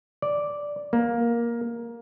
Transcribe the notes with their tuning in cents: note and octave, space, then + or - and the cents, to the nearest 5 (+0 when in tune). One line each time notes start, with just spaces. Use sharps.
D5 -5
A#3 +10